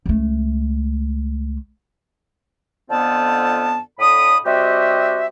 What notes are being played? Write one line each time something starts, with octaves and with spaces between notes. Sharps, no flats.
C#2 A3
F2 D3 B3 C4 F4 A5
A2 D3 B5 D#6
G3 C4 F#4 G4 D#5 E5